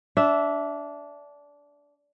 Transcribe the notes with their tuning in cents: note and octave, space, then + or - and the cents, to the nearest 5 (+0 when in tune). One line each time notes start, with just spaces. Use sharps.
D4 -20 E5 +0